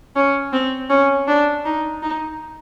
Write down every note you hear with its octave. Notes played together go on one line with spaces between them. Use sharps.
C#4
C4
C#4
D4
D#4
D#4